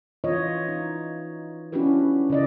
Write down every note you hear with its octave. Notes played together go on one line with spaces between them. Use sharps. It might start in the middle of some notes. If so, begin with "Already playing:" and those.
E3 F4 C#5 D#5
D#4
C#4 D4 E4 F#4 G4 B4
C#3 E4 D5 D#5